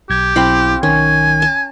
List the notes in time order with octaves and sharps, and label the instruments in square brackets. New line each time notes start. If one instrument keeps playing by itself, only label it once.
[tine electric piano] B1 G#6 [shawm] G4
[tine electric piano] B1 E4 [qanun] C4 F5 B5
[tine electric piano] B1 D#3 [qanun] C#4 [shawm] G#5
[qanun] A5